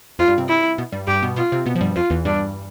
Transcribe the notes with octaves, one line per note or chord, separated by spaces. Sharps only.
F2 F3 F4
G2 G3
C3 C4
E4
B2 B3
G2 G3
G2 G3 G4
B2 B3
B2 B3 F4
C3 C4
B2 B3
F3
G2 G3
F2 F3 F4
E2 E3
G2 G3 D4